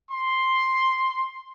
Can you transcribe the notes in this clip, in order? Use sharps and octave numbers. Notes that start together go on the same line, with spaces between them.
C6